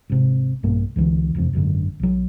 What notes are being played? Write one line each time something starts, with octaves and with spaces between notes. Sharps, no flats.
G#1 C3
A#1 G2 B2 A#3
C#2 D3 E3
E1 F2 C3
G#1 F#2 A#2 D3
B1 F#3